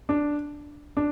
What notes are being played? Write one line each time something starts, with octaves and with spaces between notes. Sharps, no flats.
D4
D4